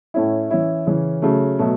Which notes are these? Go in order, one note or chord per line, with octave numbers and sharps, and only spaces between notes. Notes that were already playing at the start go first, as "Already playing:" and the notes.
A2 A3 C#4 E4
E3 C#4 E4
C#3 E3 C#4
C#3 F#3 A3
B2 F#3 A3